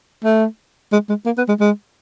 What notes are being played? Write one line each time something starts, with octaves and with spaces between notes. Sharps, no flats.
A3
G#3
G#3
A#3
B3
G#3
G#3